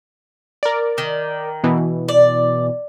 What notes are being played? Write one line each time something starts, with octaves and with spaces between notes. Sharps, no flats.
A#4 D5
D#3
B2 E3
D5